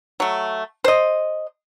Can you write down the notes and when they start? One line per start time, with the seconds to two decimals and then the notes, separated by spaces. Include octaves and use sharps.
0.20 F#3 A3
0.84 C5 D#5